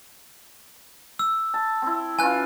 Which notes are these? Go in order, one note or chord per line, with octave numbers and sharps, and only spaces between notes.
E6
A5
C4 E4
E3 C#4 F4 G#5 F#6